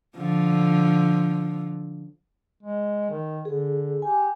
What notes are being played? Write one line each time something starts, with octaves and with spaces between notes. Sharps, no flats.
D3 F3
G#3
D#3
D3 G#4
G4 G#5